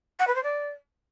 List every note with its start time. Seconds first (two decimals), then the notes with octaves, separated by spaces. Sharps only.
0.19 F#5
0.27 B4
0.35 C5
0.43 D5